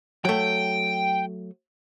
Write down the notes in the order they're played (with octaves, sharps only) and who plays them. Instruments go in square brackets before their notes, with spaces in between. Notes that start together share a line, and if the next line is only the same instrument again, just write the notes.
[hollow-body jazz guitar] F#3 A3 [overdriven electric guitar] G5